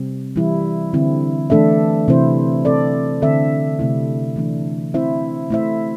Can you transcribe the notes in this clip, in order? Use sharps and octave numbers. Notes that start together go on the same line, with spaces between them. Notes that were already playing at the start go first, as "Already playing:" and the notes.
Already playing: C3 G3 C4
E3 G3 E4
D3 C4 E4
E3 A3 D4 A4 E5
C3 E3 C4 E4 C5
C4 A4 D5
D3 C4 A4 E5
C3 A3 E4
E3 A3 D4
C4 E4 C5 E5
A3 E4 C5 E5